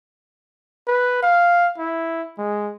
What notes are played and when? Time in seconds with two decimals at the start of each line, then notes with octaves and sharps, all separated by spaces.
0.88 B4
1.23 F5
1.78 E4
2.38 G#3